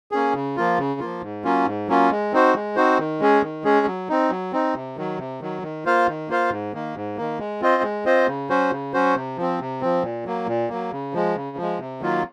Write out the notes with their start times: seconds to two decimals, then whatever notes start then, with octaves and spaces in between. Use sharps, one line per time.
0.12 A#3 C#4 G#4
0.34 C#3
0.56 F3 A#3 F4
0.78 C#3
1.00 F3 A#3 F4
1.22 G#2
1.44 F#3 A#3 C#4 F4
1.66 G#2
1.88 F#3 A#3 C#4 F4
2.11 G#3
2.32 C4 D#4 F#4 C5
2.54 G#3
2.76 C4 D#4 F#4 C5
2.99 D#3
3.20 G#3 C#4 G#4
3.42 D#3
3.64 G#3 C#4 G#4
3.86 F#3
4.09 C4 D#4
4.30 F#3
4.52 C4 D#4
4.75 C3
4.97 D#3 F#3
5.18 C3
5.41 D#3 F#3
5.62 D#3
5.85 A#3 F4 C5 F5
6.07 D#3
6.28 A#3 F4 C5 F5
6.50 G#2
6.73 D#3 A#3
6.95 G#2
7.17 D#3 A#3
7.39 G#3
7.61 C4 F4 C5 D#5
7.82 G#3
8.05 C4 F4 C5 D#5
8.27 C#3
8.50 F#3 C#4 F#4 C5
8.70 C#3
8.94 F#3 C#4 F#4 C5
9.15 C3
9.37 F3 C4
9.60 C3
9.81 F3 C4
10.03 A#2
10.25 F#3 A#3
10.47 A#2
10.69 F#3 A#3
10.92 C#3
11.13 F3 G#3
11.36 C#3
11.57 F3
11.62 G#3
11.80 C3
12.01 D#3 F#3 A#3 F4